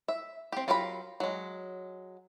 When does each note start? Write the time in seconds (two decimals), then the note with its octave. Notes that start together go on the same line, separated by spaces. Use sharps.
0.08 E5
0.52 C4 G4
0.68 F#3 F4 G4 A#4 B5
1.20 F#3 G#3